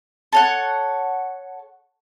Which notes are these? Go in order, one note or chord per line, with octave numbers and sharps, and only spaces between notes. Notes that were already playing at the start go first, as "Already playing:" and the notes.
A4 C#5 F#5